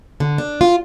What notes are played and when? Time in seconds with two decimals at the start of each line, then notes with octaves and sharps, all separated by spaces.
0.20 D3
0.38 D4
0.61 F4